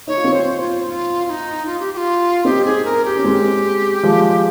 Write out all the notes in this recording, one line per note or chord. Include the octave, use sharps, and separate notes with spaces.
D#4 C#5
F4
C4 D#4
C5
F4
F4
F4
D#4
F4
G4
G4
F4
C4 D#4 G4
G#4
A#4
G4
C#4
G#3 C4
F3 G#3